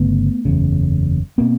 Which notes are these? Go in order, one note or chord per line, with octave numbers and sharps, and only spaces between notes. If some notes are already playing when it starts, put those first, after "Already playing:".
Already playing: G1 C#3 A3 B3
F#1 E2 C#3
B2 A#3 C4